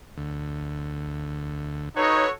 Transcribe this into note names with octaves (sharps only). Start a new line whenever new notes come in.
D2
D#4 F#4 A4 B4 C#5